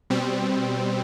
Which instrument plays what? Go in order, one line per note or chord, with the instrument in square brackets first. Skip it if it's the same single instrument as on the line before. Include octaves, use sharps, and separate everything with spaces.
[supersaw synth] B2 G3 C4